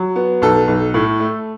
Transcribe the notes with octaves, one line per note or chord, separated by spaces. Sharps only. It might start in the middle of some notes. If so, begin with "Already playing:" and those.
Already playing: F#3
B3
B1 A4
B1
A2
A3